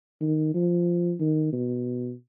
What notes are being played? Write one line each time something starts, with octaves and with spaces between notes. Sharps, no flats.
D#3
F3
D#3
B2